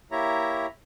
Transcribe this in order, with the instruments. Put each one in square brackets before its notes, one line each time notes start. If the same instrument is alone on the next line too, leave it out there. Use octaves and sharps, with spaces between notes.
[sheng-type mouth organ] A#3 E4 G4 C#5 E5 A#5